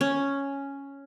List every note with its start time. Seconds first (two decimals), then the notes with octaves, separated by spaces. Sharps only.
0.01 C#4